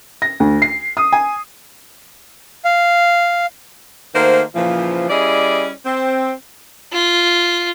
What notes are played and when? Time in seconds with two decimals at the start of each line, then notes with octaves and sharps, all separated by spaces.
0.22 A#6
0.40 D2
0.62 C7
0.97 D#6
1.12 G#5
2.65 F5
4.15 D#3 A3 A#3 F#4 C5
4.54 A#2 C#3 E3 F3
5.09 G3 C#4 E4 G#4 D5 D#5
5.86 C4
6.93 F4